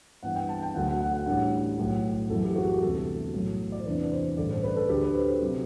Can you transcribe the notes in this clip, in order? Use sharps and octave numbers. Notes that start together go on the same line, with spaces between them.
G2 E3 B3 D4 F#5
G5
A5
G5
D2 D3 F#3 A3 D4 F#5
F#5
F#5
F#5
A1 A2 G3 D4 F#5
B1 A2 F#3
F#1 F#2 E3 B3 A4
G4
F#4
G4
D2 C3 E3 G3 B3 A4
B1 A2 F#3
D5
C5
E2 C3 E3 B3 D4 B4
C5
A1 G2 D3 A3 D5
C5
B4
A4
D2 D3 A3 G4
B4
C5
C5
C3 F#3